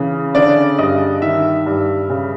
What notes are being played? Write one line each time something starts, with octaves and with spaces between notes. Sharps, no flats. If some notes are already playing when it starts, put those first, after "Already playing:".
Already playing: C#3 E3
D3 D5
G2 D#5
D#3 E5
G2
C#3